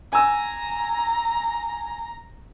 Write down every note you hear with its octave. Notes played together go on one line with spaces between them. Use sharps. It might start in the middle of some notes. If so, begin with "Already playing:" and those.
G#5 A#5 E6